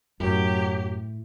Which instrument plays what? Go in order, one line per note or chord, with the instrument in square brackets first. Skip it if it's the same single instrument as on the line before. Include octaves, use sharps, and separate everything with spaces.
[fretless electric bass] F#2 [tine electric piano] A2 E4 [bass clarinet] F#3 [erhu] G4